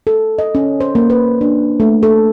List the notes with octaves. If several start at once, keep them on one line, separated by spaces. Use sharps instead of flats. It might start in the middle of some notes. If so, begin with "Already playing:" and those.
A4
D#5
C#4
C5
A#3
B4
D4
A3
A4